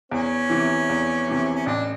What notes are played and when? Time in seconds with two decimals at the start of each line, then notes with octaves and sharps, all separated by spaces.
0.11 E2 C#4
0.50 C3 E3
0.89 E2
1.28 C3 E3
1.55 C#4
1.66 A1 D4